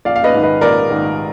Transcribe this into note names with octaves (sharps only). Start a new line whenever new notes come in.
A#1 D5 F5
F5
B4 D#5
G#2 D#3
B4 D#5
A#1 A#4 D5
G#2 D#3